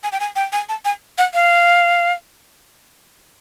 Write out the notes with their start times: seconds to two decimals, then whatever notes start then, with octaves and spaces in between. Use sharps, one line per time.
0.03 G#5
0.12 G5
0.20 G#5
0.35 G5
0.52 G#5
0.69 A5
0.85 G#5
1.18 F#5
1.34 F5